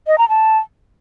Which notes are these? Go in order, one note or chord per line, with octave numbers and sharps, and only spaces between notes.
D#5
A#5
A5